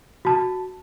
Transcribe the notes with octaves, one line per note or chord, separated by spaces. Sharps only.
F#4 A5